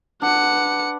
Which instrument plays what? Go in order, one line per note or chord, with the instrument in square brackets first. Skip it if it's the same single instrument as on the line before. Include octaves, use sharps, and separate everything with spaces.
[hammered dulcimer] D4 B4 [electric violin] F#5 C#7